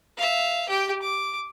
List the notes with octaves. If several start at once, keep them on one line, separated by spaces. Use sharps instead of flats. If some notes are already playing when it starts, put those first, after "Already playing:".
E5 F5
G4 G5
D6